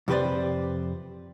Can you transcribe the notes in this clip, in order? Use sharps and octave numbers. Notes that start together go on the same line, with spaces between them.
F2 C3 G4 B4 C5 D5